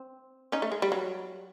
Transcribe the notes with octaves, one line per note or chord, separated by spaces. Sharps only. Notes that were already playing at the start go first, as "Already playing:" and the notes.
Already playing: C4
C#4 D#4
A3
G#3
G3
F#3